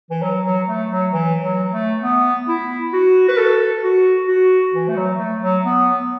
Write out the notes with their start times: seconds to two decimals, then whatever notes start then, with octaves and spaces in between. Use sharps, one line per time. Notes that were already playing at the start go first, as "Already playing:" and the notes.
0.10 E3
0.23 F#3
0.45 F#3
0.67 A3
0.90 F#3
1.13 E3
1.43 F#3
1.73 A3
2.02 B3
2.48 E4
2.93 F#4
3.29 B4
3.38 A4
3.83 F#4
4.28 F#4
4.74 E3
4.89 A3
4.97 F#3
5.19 A3
5.42 F#3
5.64 B3